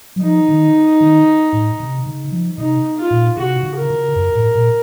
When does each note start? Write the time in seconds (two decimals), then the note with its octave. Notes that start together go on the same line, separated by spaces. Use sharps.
0.16 F#3
0.22 F3 D#4
0.49 D#3
1.01 D#3
1.53 A2
1.80 C3
2.06 C#3
2.32 F3
2.58 C3 D#4
2.98 F4
3.11 A#2
3.37 C3 F#4
3.63 C#3
3.76 A#4
3.90 C#3
4.16 F#2
4.35 A2
4.55 A#2